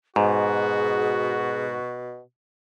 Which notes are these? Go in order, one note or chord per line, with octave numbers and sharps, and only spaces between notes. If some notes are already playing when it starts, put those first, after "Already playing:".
G#2 B2 F#4 G#4